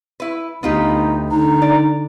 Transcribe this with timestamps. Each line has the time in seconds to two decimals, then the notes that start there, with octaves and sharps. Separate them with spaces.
0.20 E4 B4
0.63 D2 B3 D#4 F4 G4
1.31 D3 D#4 A#5
1.62 D5